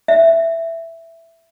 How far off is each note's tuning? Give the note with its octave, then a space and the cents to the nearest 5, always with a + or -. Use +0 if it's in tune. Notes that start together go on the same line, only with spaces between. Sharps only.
E5 +5